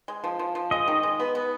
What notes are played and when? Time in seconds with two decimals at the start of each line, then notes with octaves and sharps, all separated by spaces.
0.08 G#3
0.24 F3
0.39 F3
0.55 F3
0.71 G#3 D#5
0.88 D#3
1.03 G#3
1.20 B3
1.35 B3